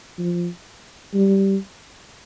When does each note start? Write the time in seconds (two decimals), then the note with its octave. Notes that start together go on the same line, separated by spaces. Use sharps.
0.19 F3
1.14 G3